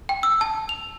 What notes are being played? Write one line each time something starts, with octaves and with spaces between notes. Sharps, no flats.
G5
E6
A5
F7